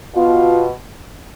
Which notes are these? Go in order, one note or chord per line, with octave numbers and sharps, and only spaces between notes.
B2 F4